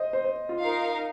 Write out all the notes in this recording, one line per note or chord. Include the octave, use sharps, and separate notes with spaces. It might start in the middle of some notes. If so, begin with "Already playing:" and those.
Already playing: C5 D#5
C5
C5
F4
D#4 A#4 F5